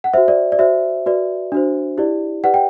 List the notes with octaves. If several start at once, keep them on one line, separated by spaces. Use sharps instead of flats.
F#5
F#4 C5 E5
D5
D5
F#4 C5 E5
F#4 B4 D5
D4 F#4 C5
E4 G4 D5
G4 B4 D5 F#5
G5